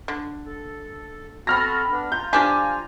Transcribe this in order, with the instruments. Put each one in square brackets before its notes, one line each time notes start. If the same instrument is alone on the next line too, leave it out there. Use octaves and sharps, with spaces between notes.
[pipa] D3
[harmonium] A4
[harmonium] C4 F#4 A4 [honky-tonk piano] B5 F6 A#6
[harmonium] B3 D4
[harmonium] F4 A#5 [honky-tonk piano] G6
[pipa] F3 D4 G4 [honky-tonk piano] G#5